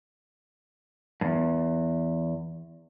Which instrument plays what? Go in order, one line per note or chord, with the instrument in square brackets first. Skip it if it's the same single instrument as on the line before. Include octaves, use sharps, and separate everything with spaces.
[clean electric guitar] E2 G2